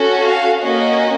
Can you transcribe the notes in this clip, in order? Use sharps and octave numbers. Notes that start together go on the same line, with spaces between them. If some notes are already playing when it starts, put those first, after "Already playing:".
Already playing: C#4 F#4 A4
F5
A#3 C#4 F#4 D#5